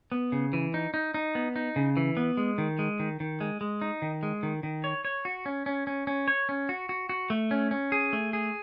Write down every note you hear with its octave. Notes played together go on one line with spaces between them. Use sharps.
B3
C#3
E3
D#4
D#4
D#4
B3
D#4
C#3
E3
B3
G#3
D#3
G#3
D#3
D#3
G#3
G#3
D#4
D#3
G#3
D#3
D#3
C#5
C#5
F#4
C#4
C#4
C#4
C#4
C#5
C#4
F#4
F#4
F#4
A3
C#4
C#4
G#4
A3
G#4